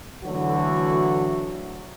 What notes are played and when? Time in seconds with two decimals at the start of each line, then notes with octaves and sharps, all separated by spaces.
0.25 D3 E3 F#3 A3 F#4